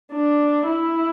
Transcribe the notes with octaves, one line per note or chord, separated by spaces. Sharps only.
D4
E4